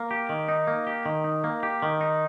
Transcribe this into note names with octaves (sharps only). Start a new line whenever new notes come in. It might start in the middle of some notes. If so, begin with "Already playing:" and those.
Already playing: A#3
G4
D#3
D#4
A#3
G4
D#3
D#4
A#3
G4
D#3
D#4